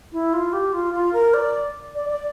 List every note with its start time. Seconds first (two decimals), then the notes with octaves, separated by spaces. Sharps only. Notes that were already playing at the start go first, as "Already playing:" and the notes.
0.12 E4
0.33 F4
0.53 G4
0.73 F4
0.93 F4
1.13 A#4
1.34 D5
1.95 D5
2.09 D5